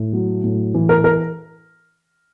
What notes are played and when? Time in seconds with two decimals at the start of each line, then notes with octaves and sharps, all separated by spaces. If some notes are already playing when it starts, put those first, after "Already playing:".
Already playing: A2
0.13 F#3
0.43 A2
0.74 E3
0.89 A#4
1.04 A#4